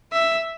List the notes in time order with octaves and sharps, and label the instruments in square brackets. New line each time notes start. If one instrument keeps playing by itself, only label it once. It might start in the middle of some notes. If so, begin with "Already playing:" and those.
[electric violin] E5